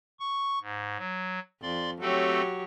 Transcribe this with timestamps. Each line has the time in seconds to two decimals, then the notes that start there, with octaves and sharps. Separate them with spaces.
0.20 C#6
0.62 G#2
0.98 F#3
1.62 F2 D5 C6
2.01 F#3 A3 C4 G4 A4 C#5